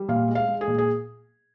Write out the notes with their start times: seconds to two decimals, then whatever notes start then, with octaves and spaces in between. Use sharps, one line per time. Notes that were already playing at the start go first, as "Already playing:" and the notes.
Already playing: G3
0.08 A#2 F5
0.28 G#3
0.35 F5
0.48 G#3
0.61 G#4
0.67 A#2
0.78 G#4